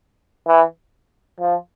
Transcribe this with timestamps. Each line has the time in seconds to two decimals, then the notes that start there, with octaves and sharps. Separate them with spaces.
0.47 E3
1.40 F3